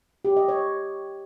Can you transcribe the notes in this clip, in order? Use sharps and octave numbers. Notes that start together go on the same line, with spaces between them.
G4
D#5
C#5